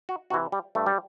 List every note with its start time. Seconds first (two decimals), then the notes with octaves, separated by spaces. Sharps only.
0.09 F#4
0.30 C3 E3 F#4
0.52 G3
0.75 G2 A3
0.86 G3